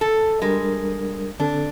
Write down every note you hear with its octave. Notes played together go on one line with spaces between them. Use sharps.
A4
G3 G#3 D4 A#4
D3 C4 D4 A4